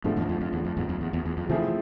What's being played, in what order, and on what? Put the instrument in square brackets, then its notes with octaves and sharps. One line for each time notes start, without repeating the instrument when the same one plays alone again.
[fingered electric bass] F2 A2 [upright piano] D3 F3 A3
[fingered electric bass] E2 G#2
F2
F2
E2
F2
E2 G#2
F2
E2
E2
E2
F2
[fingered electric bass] C3 E3 [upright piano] F3 A3 C4 E4 G#4